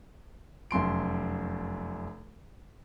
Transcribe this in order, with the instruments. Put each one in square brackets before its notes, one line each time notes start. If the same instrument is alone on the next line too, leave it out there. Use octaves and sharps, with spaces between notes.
[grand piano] F1 F#2 C6 D7